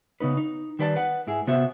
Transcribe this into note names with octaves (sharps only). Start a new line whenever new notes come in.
C#3 B3 D#4 B4
D#4
D#3 G3 B4 D5 G#5 A5
B4 F#5
G#2 E4 G#4
C3 B3 F#4 C5 E5